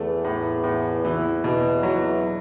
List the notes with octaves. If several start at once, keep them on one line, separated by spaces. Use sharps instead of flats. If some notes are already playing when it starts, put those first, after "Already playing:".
Already playing: E2 A3
A2
A2
E3
E2 B2
F#3